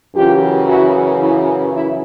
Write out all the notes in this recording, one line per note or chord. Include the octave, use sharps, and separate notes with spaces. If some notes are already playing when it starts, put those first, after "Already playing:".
F#2 C#3 E3 F4 G4
E4 F#4
E4
E4